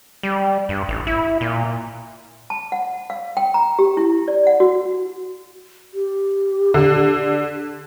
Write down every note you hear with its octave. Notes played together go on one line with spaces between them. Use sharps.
G3
G2
A1
E4
A#2
A5
F#5
F5
G5
A#5
G4
E4
D5
F#5
F#4
G4
D3